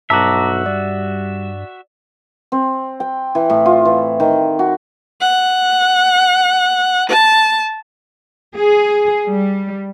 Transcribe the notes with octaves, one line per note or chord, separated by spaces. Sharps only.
B1 G2 F#4 E5 A5 A#5 D6
G3 D5
C4
G5
E3
A2
F4
E3
D#3
F#4
F#5
A5
G#4
G3